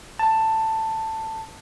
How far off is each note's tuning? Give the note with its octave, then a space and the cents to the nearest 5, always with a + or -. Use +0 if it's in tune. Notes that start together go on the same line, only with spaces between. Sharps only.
A5 +10